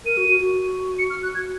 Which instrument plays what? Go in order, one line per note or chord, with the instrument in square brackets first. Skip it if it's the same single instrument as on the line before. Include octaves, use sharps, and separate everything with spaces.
[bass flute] A#4 [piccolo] D#7
[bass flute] F#4
F#4
F#4
[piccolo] C#7
F6
F#6
G#6